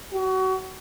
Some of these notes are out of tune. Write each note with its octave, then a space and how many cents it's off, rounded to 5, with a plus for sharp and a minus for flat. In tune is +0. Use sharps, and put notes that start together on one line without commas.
F#4 +30